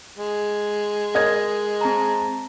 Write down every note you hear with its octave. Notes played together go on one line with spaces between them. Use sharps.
G#3
A#4 D#5 G#6
C4 A5 A#5